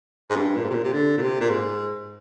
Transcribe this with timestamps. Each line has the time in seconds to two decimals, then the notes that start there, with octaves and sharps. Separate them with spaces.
0.30 G#2
0.36 G2
0.56 A#2
0.64 G#2
0.70 C3
0.74 A#2
0.84 C3
0.93 D3
1.17 A#2
1.21 C3
1.40 A#2
1.50 G#2